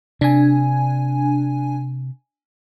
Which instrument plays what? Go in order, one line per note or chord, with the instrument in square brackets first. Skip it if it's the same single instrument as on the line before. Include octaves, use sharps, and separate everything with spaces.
[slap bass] C3 [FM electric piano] D4 G#5